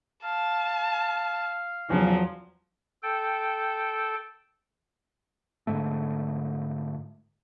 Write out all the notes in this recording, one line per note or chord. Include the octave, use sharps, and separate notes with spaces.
F5 A5
E2 C#3 F3 F#3
A4 G5
G#2 D3 G#3 A3